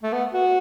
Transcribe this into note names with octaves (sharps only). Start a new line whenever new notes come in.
A3
B3
F#4